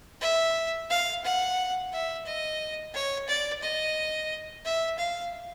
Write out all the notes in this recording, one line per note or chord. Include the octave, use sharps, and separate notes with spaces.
E5
F5
F#5
E5
D#5
C#5
D5
D#5
E5
F5